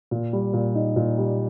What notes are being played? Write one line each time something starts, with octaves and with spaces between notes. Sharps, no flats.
A#2
G3
A#2
D#4
A#2
G3